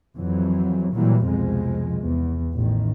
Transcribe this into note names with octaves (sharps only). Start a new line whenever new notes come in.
F2 E3 F#3
A#2 E3 F#3 G3
C2 F2 B2 F3 G#3
E2
A1 D#3